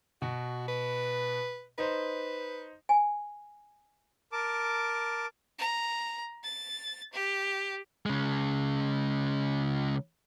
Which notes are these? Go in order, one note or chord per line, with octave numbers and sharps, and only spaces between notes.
B2 F#4
B4
D#4 B4 C5
G#5
A#4 A5 D6
A#5
A6
G4
C#3 G#3